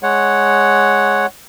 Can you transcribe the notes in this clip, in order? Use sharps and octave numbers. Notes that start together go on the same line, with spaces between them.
G#3 C#5 F#5